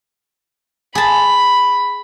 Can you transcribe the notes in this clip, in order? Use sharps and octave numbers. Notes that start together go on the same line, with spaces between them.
G#4 A5 B5